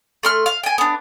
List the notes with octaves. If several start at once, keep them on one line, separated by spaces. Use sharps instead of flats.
A3 C6 F6
F5
G5 G#5
B3 D4